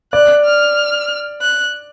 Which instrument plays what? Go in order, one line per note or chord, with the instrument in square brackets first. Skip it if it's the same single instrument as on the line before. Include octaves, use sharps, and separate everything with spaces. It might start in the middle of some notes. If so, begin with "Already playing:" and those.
[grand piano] D5 [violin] F#6
[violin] F6
F#6